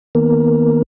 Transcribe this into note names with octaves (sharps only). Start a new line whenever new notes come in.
D#3 A#3 B3 A#4